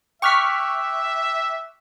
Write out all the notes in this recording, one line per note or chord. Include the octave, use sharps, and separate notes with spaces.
E5 G5 C#6 D6 F6 F#6 B6